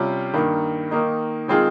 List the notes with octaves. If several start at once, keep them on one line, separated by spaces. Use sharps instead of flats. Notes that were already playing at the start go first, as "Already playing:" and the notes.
Already playing: C3 G3 C#4 F4
G2 D#3 A#3
D#3 A#3 D#4
D#3 G#3 C4 F4 G#4